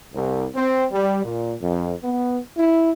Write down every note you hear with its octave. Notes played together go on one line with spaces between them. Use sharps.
C2
C4
G3
A#2
F2
B3
E4